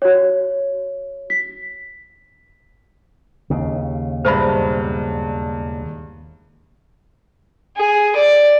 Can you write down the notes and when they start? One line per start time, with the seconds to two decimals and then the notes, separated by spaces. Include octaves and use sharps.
0.02 F#4 C#5
1.30 B6
3.50 D#2 C#3
4.25 E1 G2 B4 C5 E5 B5
7.77 G#4
8.16 D5